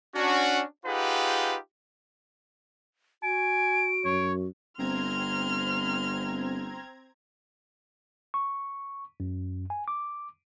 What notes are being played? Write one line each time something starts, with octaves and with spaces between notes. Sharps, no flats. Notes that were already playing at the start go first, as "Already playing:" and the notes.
C#4 D4 F#4
D#4 F4 G4 G#4 B4 F#5
F#4 G#5 D7
F#2 C#5
G1 C4 A#5 C6 F6 G#6
C#6
F#2
G#5
D6